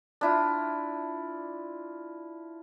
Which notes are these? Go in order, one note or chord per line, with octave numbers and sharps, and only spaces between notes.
D4 E4 F4